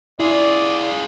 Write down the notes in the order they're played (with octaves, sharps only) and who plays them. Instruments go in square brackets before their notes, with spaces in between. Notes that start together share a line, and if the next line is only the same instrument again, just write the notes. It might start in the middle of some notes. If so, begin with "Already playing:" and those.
[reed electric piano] E4 [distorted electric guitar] F4 G#4 [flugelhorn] D5